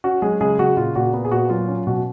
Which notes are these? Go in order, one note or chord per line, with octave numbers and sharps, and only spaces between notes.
C#4 F#4
F#3 G#3 G#4
C#3 G#3 G#4
C#3 F#4
A#2 F4
A#2 F#4
B3
G#4
A#2 F#4
F#3 F4
C#4
B2 F#4